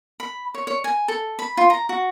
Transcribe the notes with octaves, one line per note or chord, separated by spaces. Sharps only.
B5
C#5
C#5
G#5
A4
B5
F4
A#5
F#4